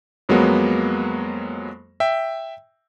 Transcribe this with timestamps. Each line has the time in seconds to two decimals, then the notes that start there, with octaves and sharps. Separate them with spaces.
0.29 F2 F#3 G#3 A#3 B3
2.00 E5 G5